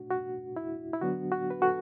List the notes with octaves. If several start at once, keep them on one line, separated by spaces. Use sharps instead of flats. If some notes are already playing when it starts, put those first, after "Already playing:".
Already playing: B2 A3 D4 F#4
F#4
E4
E4
D3 F#3 B3 D4 F#4
F#4
B4
F#4 A4